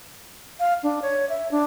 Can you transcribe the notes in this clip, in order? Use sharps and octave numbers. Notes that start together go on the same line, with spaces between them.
F5
D4
C#5
E5
D4